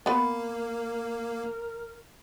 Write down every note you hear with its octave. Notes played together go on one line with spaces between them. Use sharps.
A#3 B3 A#4 B4